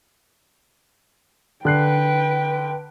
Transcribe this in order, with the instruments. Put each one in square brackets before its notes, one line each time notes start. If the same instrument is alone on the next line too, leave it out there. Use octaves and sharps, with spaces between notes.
[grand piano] D3 F#6 C7 [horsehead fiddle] B4 G5